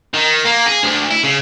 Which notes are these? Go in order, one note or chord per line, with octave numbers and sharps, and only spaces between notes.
D#3
A#3
G#4
D2
E4
C#3